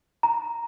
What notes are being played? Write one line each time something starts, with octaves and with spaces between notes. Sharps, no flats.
A#5